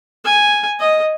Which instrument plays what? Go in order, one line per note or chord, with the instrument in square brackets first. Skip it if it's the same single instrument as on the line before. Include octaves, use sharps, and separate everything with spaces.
[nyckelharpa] G#5
D#5